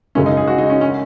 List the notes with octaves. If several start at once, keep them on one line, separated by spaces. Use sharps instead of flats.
F#2 C#3 G#3 C#4
D#4
G#4
F#4
D#4
C#4
C#4